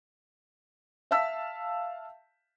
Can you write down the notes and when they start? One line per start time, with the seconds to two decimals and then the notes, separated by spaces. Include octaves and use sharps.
1.11 E5 F5 A5 E6 B6